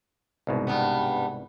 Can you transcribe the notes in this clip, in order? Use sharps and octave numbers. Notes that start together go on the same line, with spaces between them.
C2 G#2 B2
G2 B3